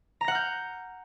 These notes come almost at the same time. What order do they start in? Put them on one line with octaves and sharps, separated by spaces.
A#5 A#6 F#5 F6 G6